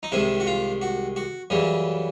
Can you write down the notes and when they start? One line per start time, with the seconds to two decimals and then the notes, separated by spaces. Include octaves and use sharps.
0.03 D#4
0.12 C2 C3 D#3 G#3 E4
0.40 F#4
0.47 F4
0.82 F#4
1.16 F#4
1.50 F#2 C#3 E3 G3